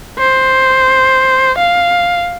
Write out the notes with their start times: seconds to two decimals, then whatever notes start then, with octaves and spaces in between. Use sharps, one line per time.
0.19 C5
1.58 F5